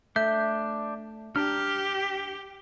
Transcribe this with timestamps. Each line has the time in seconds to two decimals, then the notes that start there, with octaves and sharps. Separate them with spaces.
0.16 A3 D4 E5 G6
1.36 D4 G4 A5 A#5 F6